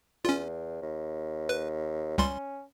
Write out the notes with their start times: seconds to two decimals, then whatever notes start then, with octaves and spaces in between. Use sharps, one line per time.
0.25 E2 C#4 F4
0.82 D#2
1.49 B4
2.18 C#2 G3 C#4 C6